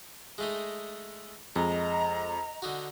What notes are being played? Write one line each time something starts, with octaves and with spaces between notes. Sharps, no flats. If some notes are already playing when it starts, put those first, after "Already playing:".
G#3 A3 D#4
F2 G#3 D#5 A#5
D3 D#4 F#4